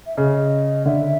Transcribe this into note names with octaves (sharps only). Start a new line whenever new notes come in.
E5
C#3 D#5
D3 E5